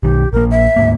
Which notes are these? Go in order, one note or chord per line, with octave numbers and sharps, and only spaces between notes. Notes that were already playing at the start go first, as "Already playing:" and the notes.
B1 D#3 G4
A#1 A#3 A#4
E5
D2 G#2 A#3